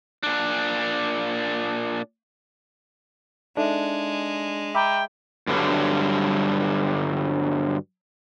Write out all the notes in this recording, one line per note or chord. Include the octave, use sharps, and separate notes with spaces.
A#2 D4
G#3 D4 D#4 A4 E5
E5 G5 A#5 B5 D6
G2 D3 F#3 G3